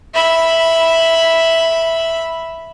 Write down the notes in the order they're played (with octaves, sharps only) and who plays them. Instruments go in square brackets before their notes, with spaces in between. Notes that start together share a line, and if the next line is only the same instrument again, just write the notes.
[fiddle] E5 B5